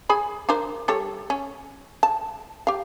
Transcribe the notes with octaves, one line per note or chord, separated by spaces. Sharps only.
G#4 G#5 B5
D4 A#4 C5
G3 A4 C#5
C#4
A5
G4 F5